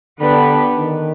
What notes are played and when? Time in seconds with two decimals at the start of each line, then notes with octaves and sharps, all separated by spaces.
0.20 D3 B3 D4 G4 B4
0.75 D#3